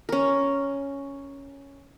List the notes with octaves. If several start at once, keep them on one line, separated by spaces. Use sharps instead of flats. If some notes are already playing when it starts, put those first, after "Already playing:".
C#4 A#4